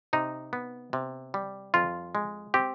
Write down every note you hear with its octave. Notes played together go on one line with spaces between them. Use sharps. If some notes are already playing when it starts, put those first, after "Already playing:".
C3 D#4
B3
C3
G3
F2 F4
G#3
C4 G4